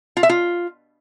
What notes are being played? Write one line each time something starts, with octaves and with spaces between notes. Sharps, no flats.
F4
E5
F4